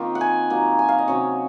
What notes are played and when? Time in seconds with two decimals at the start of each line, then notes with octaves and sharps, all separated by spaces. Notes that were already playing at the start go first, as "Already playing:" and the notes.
Already playing: D#3 A#3 C4 D#4 F4
0.15 F#5
0.21 G#5
0.50 F#3 A#3 D#4
0.79 G#5
0.89 F5
0.99 D#5
1.08 C3 F#3 C#4 C#5